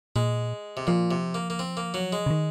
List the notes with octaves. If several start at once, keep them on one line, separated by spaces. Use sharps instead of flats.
A#2 G#3
C3
A#2 F3
C3
A#3
A#3
C4
A#3
F#3
G#3
C#3
D#3